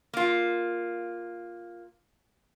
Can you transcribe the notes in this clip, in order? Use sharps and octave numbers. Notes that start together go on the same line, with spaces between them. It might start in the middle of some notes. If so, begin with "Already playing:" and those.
A#3 F4